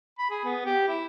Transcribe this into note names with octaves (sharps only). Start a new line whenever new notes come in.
B5
G#4
B3
G4
E4